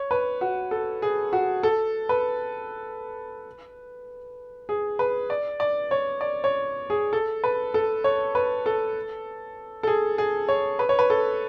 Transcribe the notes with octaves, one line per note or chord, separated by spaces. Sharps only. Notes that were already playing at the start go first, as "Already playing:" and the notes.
Already playing: C#5
B4
F#4
A4
G#4
F#4
A4
B4
G#4
B4
D5
D5
C#5
D5
C#5
G#4
A4
B4
A4
C#5
B4
A4
A4
G#4
G#4
C#5
B4
C#5
B4
A4